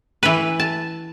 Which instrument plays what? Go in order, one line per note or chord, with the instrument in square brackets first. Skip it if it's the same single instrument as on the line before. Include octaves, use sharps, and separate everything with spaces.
[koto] E3 B4
A5